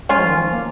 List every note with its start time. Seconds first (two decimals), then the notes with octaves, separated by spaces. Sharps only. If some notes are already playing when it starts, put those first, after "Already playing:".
0.09 G#3 C#4 F4
0.19 F3
0.28 D#3
0.38 F3
0.52 A#3